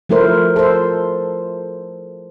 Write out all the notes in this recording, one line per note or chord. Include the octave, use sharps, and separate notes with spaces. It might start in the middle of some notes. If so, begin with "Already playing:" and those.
F3 A3 E4 A#4 C5
A4 C5